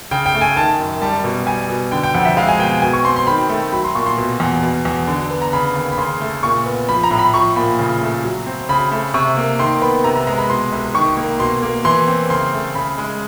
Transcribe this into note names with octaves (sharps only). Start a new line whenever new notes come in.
C#3 G5
G5
A3
G#5
D#3 A5
F#2
G3 A5
B2
G3 G#5
B2
D3 G5
G5
F2 F#5
E5
G#3 F5
G#5
B2 G5
B2 G#5
C#6
C4 C6
C6
D#3 B5
A3
F#3 B5
C6
A#2 C#6
C6
B2
E2
B2
E2
D3
B3
A#5
C#3 B5
D#2
B5
C#3 C6
A3
A#2 C#6
B3
F3 B5
A#5
A2
B5
F3 C#6
A#2 B5
C#3
A3
F#3
C4
C#3 B5
A3
C3 C#6
A#3
D#3 C6
B3 B5
C3 A#5
A#5
G#3 A#5
B5
B2 C6
C2
D#3 C#6
A#3
B2 C6
A#3
E3 C6
C4
C#3 C6
A3
C#3 B5
G#3